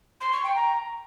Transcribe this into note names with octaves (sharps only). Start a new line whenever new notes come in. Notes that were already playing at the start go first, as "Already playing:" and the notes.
C6
C#6
G5
A#5